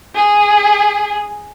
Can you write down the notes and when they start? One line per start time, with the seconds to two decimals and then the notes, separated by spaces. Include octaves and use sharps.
0.14 G#4